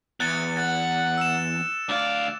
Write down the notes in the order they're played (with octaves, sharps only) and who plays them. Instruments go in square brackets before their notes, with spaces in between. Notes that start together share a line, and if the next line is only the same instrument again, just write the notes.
[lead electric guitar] E2 [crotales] F#6 A6 C#7
[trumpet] F#5 [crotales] A6
[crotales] E6 E7
[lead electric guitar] D2 F5 [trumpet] D5